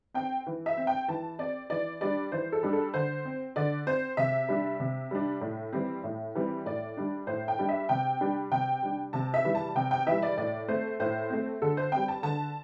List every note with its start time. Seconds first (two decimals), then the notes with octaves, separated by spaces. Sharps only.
0.14 C4 G5
0.47 E3
0.66 E5
0.77 C4
0.87 G5
1.08 E3 A5
1.39 C4 D5
1.70 E3 D5
2.01 G3 D4 D5
2.32 E3 C5
2.52 A4
2.63 G3 D4
2.73 A4
2.94 D3 C5
3.25 C4
3.56 D3 D5
3.87 C4 C5
4.17 C3 E5
4.48 G3 D4
4.80 C3
5.11 G3 D4
5.41 A2
5.73 E3 G3 C4
6.04 A2
6.35 E3 G3 C4
6.66 A2 D5
6.97 G3 D4
7.27 A2 C5
7.48 G5
7.59 G3 D4
7.69 E5
7.89 C3 G5
8.21 G3 D4
8.51 C3 G5
8.82 G3 D4
9.13 C3 A5
9.34 E5
9.44 E3 G3
9.55 A5
9.75 C3 G5
9.91 G5
10.07 E3 G3 E5
10.22 D5
10.37 A2 D5
10.68 A3 C4 C5
11.00 A2 C5
11.30 A3 C4
11.62 D3 A4
11.77 C5
11.92 G3 C4 G5
12.08 A5
12.23 D3 A5